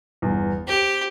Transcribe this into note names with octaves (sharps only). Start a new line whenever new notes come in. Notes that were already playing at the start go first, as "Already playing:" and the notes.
G1 E2
C4 G4 D7